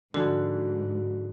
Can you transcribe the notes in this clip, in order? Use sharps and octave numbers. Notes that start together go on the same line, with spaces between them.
G#2 D3 F3 G#3 F#4 B5